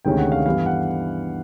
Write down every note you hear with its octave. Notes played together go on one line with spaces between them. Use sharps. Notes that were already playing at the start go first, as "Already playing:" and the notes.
D2 C3 D#3 G#3 C#4 G5
F#5
F5
G2 E3 G3 B3 F5
F#5